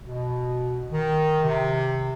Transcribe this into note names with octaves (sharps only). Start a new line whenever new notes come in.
B2
D#3
C3